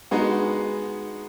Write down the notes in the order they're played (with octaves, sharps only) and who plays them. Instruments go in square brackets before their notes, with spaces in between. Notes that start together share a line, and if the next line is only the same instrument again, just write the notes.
[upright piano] G#3 B3 D#4 F#4